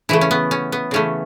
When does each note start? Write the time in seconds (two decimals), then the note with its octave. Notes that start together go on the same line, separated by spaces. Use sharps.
0.09 C#3 E3 A3 E4
0.21 C#4
0.31 B3
0.51 C#4
0.72 B3
0.91 C#3 E3 A3 C#4